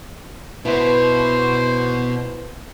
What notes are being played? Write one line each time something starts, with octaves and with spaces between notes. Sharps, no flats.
B2 E4 B4 C5